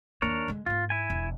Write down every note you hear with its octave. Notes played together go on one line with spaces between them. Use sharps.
D#2 A#3 D4 A#4 C#5
D3 G#3
G#2 A#3 F4
E4 G#5
E1